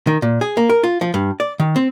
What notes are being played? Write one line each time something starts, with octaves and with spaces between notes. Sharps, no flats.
D#3
A#2
G#4
A#3
A#4
F4
F3
G2
D5
D#3
C4